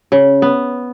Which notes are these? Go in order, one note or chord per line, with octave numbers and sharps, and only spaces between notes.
C#3
B3